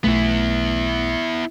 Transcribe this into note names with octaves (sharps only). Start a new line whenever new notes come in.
B1 A3 B3 E4